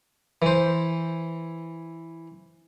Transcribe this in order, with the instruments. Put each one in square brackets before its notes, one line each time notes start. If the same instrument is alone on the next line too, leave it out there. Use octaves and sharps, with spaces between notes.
[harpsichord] E3 C5